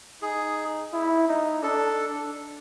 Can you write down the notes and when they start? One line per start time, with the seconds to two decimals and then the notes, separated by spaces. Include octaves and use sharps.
0.22 D#4 G#4
0.93 E4
1.28 D#4
1.62 D4 A4